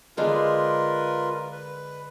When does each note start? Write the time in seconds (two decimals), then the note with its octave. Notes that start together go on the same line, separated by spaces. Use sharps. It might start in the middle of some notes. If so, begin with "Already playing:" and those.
0.17 D3 G#3 D4 F4 A#4 B4
1.52 B4